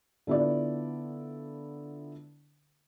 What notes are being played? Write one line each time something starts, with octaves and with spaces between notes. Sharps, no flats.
D3 B3 E4 F4 D5